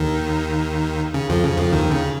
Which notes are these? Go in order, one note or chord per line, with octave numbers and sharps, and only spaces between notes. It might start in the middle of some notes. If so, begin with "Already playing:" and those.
Already playing: D#2 D#3
C#3
F2 F3
C#3
F2 F3
D#2 D#3
C#3